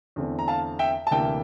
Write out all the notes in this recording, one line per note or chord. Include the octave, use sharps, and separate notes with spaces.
E2 D3 A3 C4
A#5
F5 A5
E5 G5
A5
D2 C3 E3 A#3 D4 E5 G5